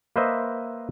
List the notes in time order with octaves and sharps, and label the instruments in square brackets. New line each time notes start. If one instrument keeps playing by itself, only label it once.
[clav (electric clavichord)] A#3 B4 C5 D#5 E5